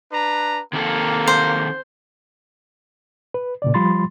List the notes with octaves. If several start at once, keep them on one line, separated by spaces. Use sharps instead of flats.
D4 B4 A#5
D#3 A#3 C4 A4
C5
B4
A#2 C#3 D5
F3 G3 F4 B5 C6 A6